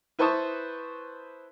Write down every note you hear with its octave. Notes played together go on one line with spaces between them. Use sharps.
E4 B4 C5 A5 C#6 D#6